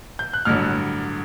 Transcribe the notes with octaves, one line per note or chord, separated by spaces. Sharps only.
G6
F#6
A1 G2 D3 F#3 F6